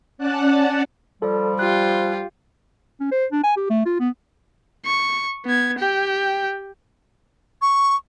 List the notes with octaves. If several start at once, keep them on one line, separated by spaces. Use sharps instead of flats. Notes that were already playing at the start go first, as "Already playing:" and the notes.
C#4 D5 F#5 A5 F#6
F3 G3 A4 D5
F4 G4 F#6
C#4
C5
D4
G#5
G4
A3
F4
B3
C#6
B3 G#6
G4 G5
C#6